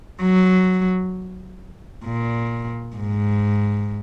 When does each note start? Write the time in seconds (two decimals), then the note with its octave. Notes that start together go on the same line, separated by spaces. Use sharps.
0.22 F#3
2.05 A#2
2.96 G#2